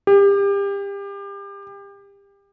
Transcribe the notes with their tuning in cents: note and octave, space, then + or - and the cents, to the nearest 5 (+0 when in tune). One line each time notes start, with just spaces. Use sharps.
G4 +30